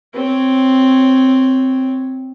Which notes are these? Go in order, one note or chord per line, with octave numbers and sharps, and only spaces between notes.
C4 C#5